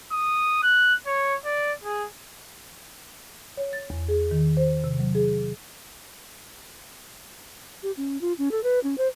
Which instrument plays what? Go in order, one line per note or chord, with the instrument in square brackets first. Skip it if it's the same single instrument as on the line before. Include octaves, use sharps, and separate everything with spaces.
[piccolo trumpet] D#6
F#6
C#5
D5
G#4
[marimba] C#5
A6
E2
G#4
D#3
C5
C3
F#3
G#4
[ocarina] G4
C#4
F4
C#4
A4
B4
C#4
C5